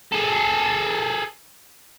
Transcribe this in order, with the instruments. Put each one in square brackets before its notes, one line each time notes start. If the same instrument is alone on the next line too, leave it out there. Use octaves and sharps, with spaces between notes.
[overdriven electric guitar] G#4 A4